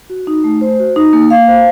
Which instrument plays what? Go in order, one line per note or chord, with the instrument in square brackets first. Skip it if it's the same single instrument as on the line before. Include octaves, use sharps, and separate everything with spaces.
[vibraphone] F#4
D#4
A3
C5
F#4
D#4
A#3
F5
C5